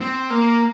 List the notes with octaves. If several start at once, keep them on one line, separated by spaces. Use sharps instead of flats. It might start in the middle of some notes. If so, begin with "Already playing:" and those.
C4
A#3